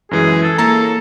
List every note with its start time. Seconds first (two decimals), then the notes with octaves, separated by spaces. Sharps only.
0.11 F#2 E3 G#3 G#4
0.43 A4
0.58 A#3 E4 A4 C#5 A#5